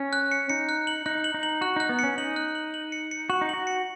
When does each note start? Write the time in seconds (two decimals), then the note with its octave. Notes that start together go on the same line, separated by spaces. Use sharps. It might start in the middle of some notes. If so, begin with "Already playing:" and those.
Already playing: C#4
0.13 F#6
0.31 C#7
0.50 D#4 C#7
0.69 F#6
0.87 F#7
1.06 D#4 F#6
1.24 F#7
1.34 D#4
1.43 F#7
1.61 F#4 F#6
1.76 D#4 F#6
1.89 B3
1.99 C#4 C#7
2.18 D#4 F#7
2.36 F#6
2.55 F#7
2.74 F#7
2.92 C#7
3.11 C#7
3.30 F#4 F#7
3.41 D#4
3.49 F#4 F#7
3.67 C#7